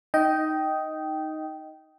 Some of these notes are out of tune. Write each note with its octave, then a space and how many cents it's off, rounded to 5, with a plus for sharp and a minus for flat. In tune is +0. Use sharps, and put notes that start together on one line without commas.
D#4 +0 D#5 +10 G5 -15